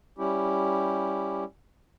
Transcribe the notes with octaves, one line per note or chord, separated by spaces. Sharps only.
G3 C#4 E4 G4